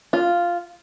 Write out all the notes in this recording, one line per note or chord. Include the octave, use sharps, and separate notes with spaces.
F4